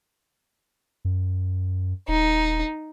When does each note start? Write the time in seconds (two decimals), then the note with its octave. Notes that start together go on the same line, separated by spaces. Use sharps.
1.05 F#2
2.08 D#1 D#4